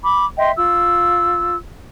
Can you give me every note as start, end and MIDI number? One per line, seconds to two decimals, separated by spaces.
0.04 0.25 83
0.04 0.25 86
0.38 0.51 75
0.38 0.51 76
0.38 0.51 79
0.38 0.51 84
0.55 1.56 65
0.55 1.56 88